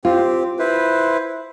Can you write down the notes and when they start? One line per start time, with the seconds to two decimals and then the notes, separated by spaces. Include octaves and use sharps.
0.05 C4 F4 G4
0.59 E4 B4 C5